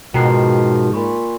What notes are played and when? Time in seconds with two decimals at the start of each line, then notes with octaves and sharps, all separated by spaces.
0.14 G#2 B2 D#3 F3 G5 A#5 C7
0.93 A#2 B5 C#6